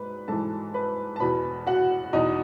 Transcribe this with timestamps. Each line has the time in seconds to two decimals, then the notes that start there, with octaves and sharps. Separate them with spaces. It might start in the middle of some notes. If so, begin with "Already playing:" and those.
Already playing: G#2 B4 B5
0.28 G#2 E3 A4 A5
0.74 B4 B5
1.16 A5
1.20 E2 B2 B4 B5
1.67 F#4 F#5
2.13 E2 B2 D#4 D#5